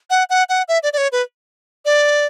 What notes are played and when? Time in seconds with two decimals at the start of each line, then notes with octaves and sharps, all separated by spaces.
0.10 F#5
0.30 F#5
0.49 F#5
0.68 E5
0.83 D5
0.93 D5
0.98 C#5
1.12 B4
1.85 D5